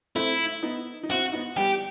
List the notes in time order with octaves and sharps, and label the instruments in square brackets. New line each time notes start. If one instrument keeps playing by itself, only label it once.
[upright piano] A3 C4 [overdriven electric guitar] E4
[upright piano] B3 D#4
D#4
[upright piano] C4 E4 [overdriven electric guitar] F#4
[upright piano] B3 D#4
[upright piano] G3 B3 [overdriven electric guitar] G4